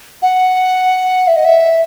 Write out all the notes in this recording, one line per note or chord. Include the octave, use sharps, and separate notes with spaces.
F#5
E5
D#5
E5